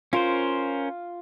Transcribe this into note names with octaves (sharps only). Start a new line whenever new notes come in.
C#4 F4 A#4 C5